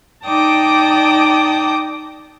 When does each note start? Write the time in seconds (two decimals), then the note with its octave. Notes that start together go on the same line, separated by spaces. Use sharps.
0.25 D#4 D5 G5 A5 D6 D#6